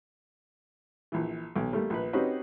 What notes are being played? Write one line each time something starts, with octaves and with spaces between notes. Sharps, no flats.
A#1 E3
B1
G3 A3 A#3
A#1 B4
C4 C#4 D#4 F#4 G4 B4